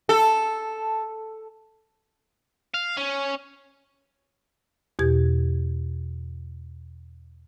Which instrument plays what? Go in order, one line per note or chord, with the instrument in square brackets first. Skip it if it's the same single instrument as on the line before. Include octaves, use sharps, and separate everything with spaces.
[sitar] A4
[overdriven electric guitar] F5
C#4
[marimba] E2 B2 G4 G#6